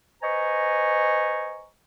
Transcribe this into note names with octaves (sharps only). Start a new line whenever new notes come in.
B4 C5 D#5 G#5 A#5 C#6